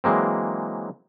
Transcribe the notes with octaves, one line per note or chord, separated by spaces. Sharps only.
E3 F#3 G#3 A#3 C4